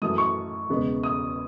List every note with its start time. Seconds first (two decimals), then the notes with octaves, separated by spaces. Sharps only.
0.02 F#2 E3 A3 D#6
0.18 C#6
0.69 E1 E2 C#3 G#3 B3
1.03 D#6